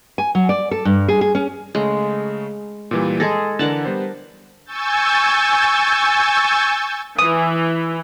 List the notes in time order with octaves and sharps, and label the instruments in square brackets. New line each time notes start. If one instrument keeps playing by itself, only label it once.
[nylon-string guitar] G#5
F#3
D5
A4
G2
G#4
G#4
C#4
[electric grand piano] C#3 A3 [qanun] G#3
[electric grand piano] A#2 E3 G3
[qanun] G#3 G#4 A4 [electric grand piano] A#6
[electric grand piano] D3 E3 D4 [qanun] A#4 F#5 A5
[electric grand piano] G3 B3 C5
[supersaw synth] G#5 C#6 E6 G6 A6
[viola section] E3 [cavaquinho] D#6